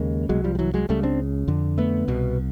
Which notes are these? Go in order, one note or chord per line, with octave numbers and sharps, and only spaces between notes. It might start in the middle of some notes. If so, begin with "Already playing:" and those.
Already playing: D#2 C#3 G#3 A#3
C2 B2 F#3 G#3
F3 G3
G3
E3 F#3
F#3 G#3
C#2 C#3 G3 A3
C4 D4
F2 D3
A3 B3
C2 B2